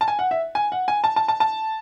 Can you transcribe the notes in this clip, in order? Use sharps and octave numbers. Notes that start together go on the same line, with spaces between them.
A5
G#5
F#5
E5
G#5
F#5
G#5
A5
A5
A5
A5